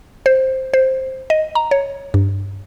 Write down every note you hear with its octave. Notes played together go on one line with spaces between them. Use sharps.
C5
C5
D#5
A#5
C#5
G2